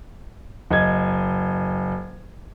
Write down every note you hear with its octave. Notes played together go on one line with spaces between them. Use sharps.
F#1 D#5 G#6